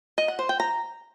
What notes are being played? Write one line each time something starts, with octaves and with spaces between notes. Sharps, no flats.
D#5
F#5
C5
G5
A#5